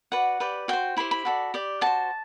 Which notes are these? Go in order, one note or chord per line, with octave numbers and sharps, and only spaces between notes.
F#4 B4 D5 F#5
G4 B4 D5
F#4 C5 G5
E4 G4 C5 B5
B5
F#4 A4 D5
G4 D5
F#4 C5 A5